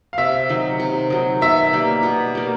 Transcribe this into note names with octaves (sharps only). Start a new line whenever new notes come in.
F5
C3 E5
D#3 F#3
C3
D#3 F#3
B2 E5
G3 A#3
B2
G3 A#3